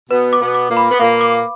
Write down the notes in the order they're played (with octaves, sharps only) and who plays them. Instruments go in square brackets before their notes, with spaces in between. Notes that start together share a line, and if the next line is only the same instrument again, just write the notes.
[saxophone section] B2 B3 [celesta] B4
[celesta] D6
[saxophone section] B2 B3
[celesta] D6
[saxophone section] A#2 A#3
[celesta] B5
[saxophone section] B3
[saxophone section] A#2 A#3 [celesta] F5
[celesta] D6